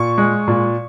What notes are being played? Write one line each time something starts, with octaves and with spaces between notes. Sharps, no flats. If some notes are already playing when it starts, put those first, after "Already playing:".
Already playing: A#2 C#6
G#3
A#2